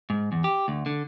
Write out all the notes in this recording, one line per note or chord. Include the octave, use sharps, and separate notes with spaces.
G#2
E2
G4
D2
D3